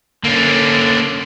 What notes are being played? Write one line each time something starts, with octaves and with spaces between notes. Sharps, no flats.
D3 A#3 C#4